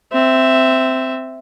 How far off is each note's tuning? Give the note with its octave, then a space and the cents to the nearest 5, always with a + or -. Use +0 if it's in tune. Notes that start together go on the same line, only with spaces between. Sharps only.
C4 -10 E5 +0